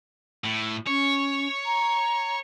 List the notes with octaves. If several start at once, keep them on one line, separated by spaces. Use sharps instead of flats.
A2
C#4 C#5
A#5